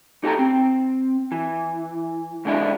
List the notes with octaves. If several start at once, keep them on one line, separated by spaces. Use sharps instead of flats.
D#4 G4 A4 A#5
C4
E3
G#2 D3 G#3 D4 E4